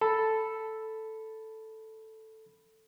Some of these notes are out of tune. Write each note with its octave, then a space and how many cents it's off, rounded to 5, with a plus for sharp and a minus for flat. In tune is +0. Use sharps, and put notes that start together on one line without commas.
A4 +0 B5 +0